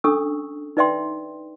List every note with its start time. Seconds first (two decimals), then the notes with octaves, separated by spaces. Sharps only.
0.04 C#4 D4 A4 C#6 D#6 E6
0.77 D#4 B4 D5 E5 G5 C6